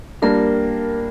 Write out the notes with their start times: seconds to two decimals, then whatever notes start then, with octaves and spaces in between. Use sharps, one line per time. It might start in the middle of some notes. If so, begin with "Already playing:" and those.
0.22 G3 A#3 D4 A#4